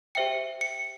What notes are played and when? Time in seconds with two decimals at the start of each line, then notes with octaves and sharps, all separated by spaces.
0.15 G4 C5 E5 G5 C#7
0.61 C#7